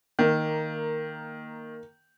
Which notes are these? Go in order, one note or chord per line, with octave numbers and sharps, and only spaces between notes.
D#3 A#3